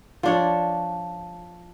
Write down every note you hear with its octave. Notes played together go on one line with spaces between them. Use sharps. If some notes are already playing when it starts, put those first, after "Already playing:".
F3 D4 C#5